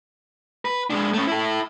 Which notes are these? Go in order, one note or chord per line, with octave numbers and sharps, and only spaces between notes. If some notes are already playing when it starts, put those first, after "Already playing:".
B4
G#3 D4
A3 C#4
E4 A4